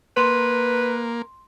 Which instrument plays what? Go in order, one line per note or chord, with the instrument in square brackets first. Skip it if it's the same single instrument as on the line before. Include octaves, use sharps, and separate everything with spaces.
[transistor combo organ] A#3 [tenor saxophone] B4 [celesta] C6